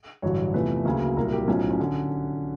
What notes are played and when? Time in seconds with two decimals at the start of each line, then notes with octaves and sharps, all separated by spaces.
0.22 A1 G2 D3 F#3 C#5
0.54 E2 C3 F3 A3 B4
0.85 D2 C#3 F#3 A#3
1.17 C2 A#2 F#3 A#4
1.33 G4
1.48 B1 A2 F3 C#4
1.71 C#4
1.80 D3